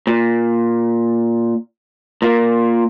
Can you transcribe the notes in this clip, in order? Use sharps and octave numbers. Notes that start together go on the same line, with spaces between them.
A#2
A#2 A#3